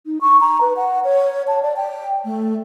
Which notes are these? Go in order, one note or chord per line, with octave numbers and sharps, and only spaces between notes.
D#4
C#6
A#5
B4
F#5
C#5
A5
D5
G5
A3